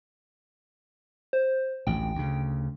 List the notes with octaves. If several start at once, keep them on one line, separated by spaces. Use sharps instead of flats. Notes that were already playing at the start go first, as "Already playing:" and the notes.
C5
A1 D2 G5
D2 C#3